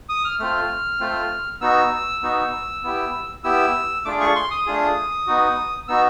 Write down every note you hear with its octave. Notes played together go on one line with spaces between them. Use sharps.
D#6
F6
A3 C4 F4 F6
A3 C4 F4
B3 D#4 F#4 E6
B3 D#4 F#4
B3 E4 G4
B3 E4 G4 E6
A3 D4 F4 G#4 D6
C#6
C6
D#6
A3 D4 F4 G#4
B3 D#4 F#4
B3 D#4 F#4 E6